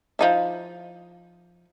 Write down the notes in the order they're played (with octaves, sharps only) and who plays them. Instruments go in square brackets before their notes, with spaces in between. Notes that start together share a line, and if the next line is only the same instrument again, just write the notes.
[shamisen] F3 D#4 E4